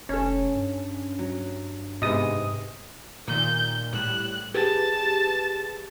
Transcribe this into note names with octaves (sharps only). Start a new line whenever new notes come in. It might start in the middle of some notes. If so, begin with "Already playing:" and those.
F1 C#4 A4 C#5
G2
F#3
G#2 C3 G#3 B3 D#5 D#6
A#2 D#3 G6
A2 G3 F#6 E7
G4 G#4 B4 A5